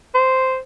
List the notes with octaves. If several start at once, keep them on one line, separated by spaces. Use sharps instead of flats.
C5